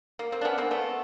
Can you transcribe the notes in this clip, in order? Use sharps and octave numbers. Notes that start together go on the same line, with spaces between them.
A#3
A#3 C4
D4
B3 C#4
A#3 C4
A3 B3